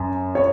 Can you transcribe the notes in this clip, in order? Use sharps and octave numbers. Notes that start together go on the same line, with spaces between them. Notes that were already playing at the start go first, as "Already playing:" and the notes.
Already playing: F#2
C#5